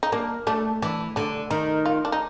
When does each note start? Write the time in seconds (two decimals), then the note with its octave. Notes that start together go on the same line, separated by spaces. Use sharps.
0.03 D#4
0.12 A#3 D4
0.47 A3 D4
0.82 E3 D4
1.16 D3 D4
1.50 D#3 D#4
1.85 F4
2.05 D4
2.12 D#4